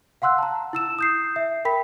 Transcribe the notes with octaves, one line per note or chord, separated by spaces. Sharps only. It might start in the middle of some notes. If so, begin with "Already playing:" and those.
F5 F#5 C6 E6 F#6
A5 A#5
E4 E6 E7
D#6 G6 C7
E5
A#4 G5 B5 B6